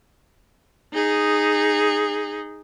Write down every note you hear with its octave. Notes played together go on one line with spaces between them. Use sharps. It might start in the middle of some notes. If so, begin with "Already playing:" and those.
D#4 G#4